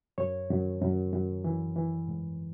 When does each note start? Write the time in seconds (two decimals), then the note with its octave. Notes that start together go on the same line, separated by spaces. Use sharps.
0.18 F#2 C#5
0.50 F#2
0.82 F#2
1.13 F#2
1.44 E3
1.76 E3
2.08 G#2